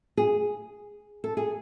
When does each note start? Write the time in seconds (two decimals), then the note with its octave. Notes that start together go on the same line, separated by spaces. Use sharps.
0.17 G#4
1.24 A4
1.37 G#4